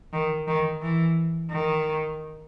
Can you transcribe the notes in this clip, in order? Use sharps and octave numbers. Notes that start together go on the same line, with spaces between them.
D#3
D#3
E3
D#3